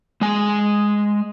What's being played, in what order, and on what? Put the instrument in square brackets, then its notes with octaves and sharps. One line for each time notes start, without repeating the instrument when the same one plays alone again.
[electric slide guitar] G#3 G#5